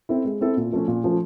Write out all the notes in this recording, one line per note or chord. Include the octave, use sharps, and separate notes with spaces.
C4 E4 A4
G#3
C4 E4 A4
A#2
F3 A3 C#4
A#2
F3 A3 C#4